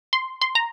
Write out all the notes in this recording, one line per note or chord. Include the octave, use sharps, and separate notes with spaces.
C6
C6
A#5